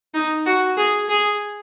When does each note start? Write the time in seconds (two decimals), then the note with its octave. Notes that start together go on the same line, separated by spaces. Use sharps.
0.14 D#4
0.46 F#4
0.77 G#4
1.08 G#4